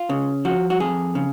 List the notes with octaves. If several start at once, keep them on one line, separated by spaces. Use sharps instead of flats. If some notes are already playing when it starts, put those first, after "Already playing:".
Already playing: F4
C#3
F3 F#4
F#4
F2 G#4
C#3